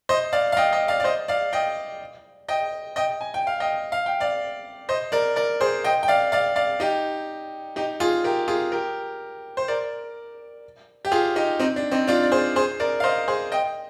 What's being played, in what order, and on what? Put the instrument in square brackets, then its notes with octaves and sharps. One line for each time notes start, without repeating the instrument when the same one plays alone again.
[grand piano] C5 D#5
D5 F5
F5
D#5 G5
D#5 G5
D5 F5
D5
C5 D#5
D5 F5
D#5 G5
D#5 G5
D#5 G5
G#5
G5
F5
D#5 G5
F5
G5
D5 F5
C5 D#5
A#4 D5
A#4 D5
G#4 C5
D#5 G5
G5
D5 F5
D5 F5
D5 F5
D#4 G4
D#4 G4
F4 G#4
G4 A#4
F4 G#4
G4 A#4
C5
A#4 D5
G4
F4 G#4
D#4 G4
C4 D#4
D4
C4 D#4
D4 F4
D5
G#4 C5
G#4 C5
A#4 D5
F5
C5 D#5
G#4 C5
D#5 G5